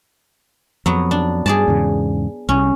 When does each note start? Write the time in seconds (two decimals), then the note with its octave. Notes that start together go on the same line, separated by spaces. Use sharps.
0.86 F2 F#3 B3
1.11 D4
1.46 G2 G#4 D5 A5
1.68 E2 G#2 C#3
2.49 C2 C#4